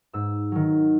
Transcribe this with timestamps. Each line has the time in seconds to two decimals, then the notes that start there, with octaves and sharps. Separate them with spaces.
0.13 G#2 E6
0.52 D#3 F#3